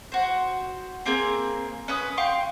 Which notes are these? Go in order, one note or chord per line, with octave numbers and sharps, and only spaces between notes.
F#4 C5
A#3 C4 G#4 A#4
C#4 B4 D#6
F5 G5 C6 C#6